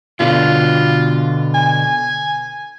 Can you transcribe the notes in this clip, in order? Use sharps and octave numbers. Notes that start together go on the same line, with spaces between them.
B2 D3 F4
G#5